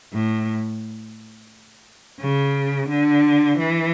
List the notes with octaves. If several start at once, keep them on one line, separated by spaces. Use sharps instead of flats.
A2
C#3
D3
E3